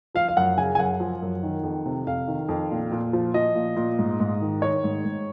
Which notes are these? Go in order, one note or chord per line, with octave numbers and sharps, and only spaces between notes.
F3 F5
F5
F#2 F#5
C#3 G#5
G#5
F#2 F#5
F3
F#2
D#3
F2
C3
F2 F5
D#3
F2
A#2
A#2
F3
F3 D#5
A#2
A#2
G#2
G#2
D#3
D#3 C#5
G#2
G#2